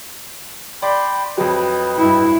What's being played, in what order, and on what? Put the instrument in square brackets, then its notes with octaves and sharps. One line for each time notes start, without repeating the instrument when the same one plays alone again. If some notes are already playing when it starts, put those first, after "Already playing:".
[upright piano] D5 [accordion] G5 B5 C6
[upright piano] F2 F#3 [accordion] B4 D#5 G5
[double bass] G2 E4